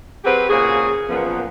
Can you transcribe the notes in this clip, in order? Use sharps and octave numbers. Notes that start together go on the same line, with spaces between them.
F#3 C4 G4 G#4 B4
A#2 C#3 F#4 G#4
F#2 A#2 F3 B3